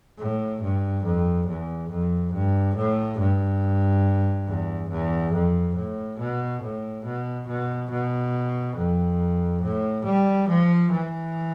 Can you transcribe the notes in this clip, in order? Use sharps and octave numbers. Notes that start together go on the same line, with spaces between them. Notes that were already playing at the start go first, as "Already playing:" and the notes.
A2
G2
F2
E2
F2
G2
A2
G2
E2
E2
F2
A2
B2
A2
B2
B2
B2
F2
A2
G3
F3
E3